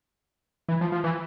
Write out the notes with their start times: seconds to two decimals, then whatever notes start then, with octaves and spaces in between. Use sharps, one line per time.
0.69 E3
0.81 F3
0.92 F3
1.04 E3